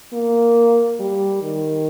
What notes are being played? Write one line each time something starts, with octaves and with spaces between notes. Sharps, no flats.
A#3
G3
D#3